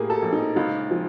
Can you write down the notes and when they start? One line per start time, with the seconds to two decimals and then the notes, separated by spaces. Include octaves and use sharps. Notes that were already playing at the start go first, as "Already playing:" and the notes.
Already playing: A2 A#3 G4 G#4
0.10 A4
0.22 A#1
0.33 D#4
0.56 C#2 D#4
0.91 F3